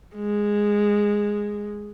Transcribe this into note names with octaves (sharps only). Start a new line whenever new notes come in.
G#3